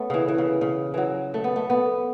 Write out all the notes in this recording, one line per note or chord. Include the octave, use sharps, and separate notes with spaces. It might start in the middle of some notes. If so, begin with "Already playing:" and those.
Already playing: A3 B3 C#4 A4
C#3 E3
E3
C#3
C#3
E3 F#3
A3
B3
A3
B3